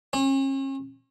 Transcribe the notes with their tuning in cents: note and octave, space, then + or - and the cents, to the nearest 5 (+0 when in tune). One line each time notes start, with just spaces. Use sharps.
C#4 -40